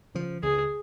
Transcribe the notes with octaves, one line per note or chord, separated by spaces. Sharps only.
C#3 F3
C#2 G#4